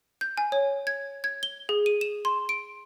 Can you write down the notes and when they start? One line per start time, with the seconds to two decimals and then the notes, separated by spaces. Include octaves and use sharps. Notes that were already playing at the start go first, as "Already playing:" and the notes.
0.21 G6
0.37 G#5
0.52 C#5
0.87 G#6
1.24 G#6
1.43 G7
1.69 G#4
1.86 D#7
2.01 E7
2.25 C6
2.49 D7